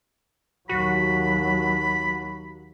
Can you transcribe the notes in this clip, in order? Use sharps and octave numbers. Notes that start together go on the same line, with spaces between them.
D#2 F#3 F#4 B5